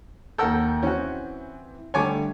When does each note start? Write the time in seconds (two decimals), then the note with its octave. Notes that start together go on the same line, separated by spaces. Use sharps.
0.38 D#2 A4 A#4 F#5 E6 G6
0.83 E3 C4 C#4 F#4
1.94 D3 G3 A3 C#5 G#5 D6